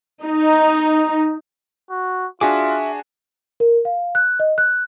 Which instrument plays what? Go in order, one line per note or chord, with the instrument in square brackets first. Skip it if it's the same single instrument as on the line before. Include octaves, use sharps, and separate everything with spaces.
[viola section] D#4
[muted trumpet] F#4
[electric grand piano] D4 F#4 G#4 [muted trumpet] F4 [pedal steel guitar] E5 D6 [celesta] G#5
[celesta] A#4
F5
F#6
D#5
F#6